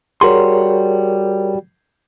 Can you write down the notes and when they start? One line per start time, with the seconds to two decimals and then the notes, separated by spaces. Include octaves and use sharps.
0.21 G3 F#4 G#4 A#4 C#5 C6